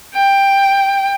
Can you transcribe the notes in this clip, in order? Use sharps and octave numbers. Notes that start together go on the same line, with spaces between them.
G5